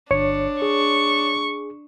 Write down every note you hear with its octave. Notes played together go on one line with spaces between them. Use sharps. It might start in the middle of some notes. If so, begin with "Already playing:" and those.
G1 D4 C#5 C#7
G#4 C#6